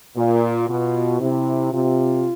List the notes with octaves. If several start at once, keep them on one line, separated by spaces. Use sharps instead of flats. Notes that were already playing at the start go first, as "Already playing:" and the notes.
A#2 F4
B2 F4
C3 E4
C3 F4